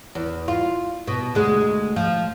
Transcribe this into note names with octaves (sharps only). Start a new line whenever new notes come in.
E2
F4
B2
D2 G#3
F3